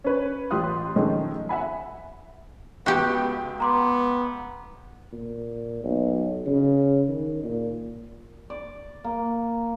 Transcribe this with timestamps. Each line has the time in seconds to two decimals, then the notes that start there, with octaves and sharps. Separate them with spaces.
0.04 C#4 B4 C#5
0.51 A1 F4 G4 C6 D#6 F#6
0.96 D#3 F3 G#3 A3 C#4 D#4
1.49 E5 F#5 G#5 B5
2.86 C#2 B3 F#4 G4 G5
3.60 B3 A#5 C6 D6
5.12 A#2
5.84 B1
6.46 C#3
7.09 D#3
7.44 A#2
8.50 D5
9.04 A#3